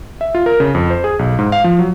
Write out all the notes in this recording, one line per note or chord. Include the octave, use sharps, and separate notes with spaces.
E5
F4
A#4
C#3
F2
C5
G#4
B1
G#2
F5
F3
F#3